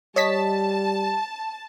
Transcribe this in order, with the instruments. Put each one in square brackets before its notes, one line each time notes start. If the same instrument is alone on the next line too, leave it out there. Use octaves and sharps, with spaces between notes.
[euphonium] G3 [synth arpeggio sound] C#5 D#5 B6 [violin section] A5